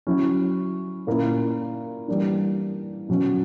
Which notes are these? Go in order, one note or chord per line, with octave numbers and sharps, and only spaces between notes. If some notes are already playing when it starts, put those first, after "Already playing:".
F#3 C#4 E4
A#2 A#3 C#4 E4
E3 G3 A#3 D4
B2 F#3 C#4